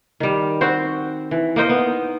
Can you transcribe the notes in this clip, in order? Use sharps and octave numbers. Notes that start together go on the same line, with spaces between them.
D#3 G3
C4 F#4 C5
E3
A#3 D#4 C5 D#5
B3